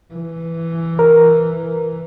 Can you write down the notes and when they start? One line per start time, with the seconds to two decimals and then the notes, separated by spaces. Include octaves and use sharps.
0.14 E3
0.99 A#4